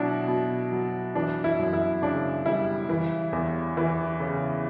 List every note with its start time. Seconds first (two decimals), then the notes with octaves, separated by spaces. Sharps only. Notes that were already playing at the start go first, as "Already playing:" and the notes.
Already playing: B2 F#3 D4 E4
0.28 B2
0.72 F#3
1.15 E3 D4
1.44 E4
1.59 F#2
1.73 E4
2.02 C#3 D4
2.46 G3 E4
2.89 E3
3.33 E2
3.77 E3
4.20 C#3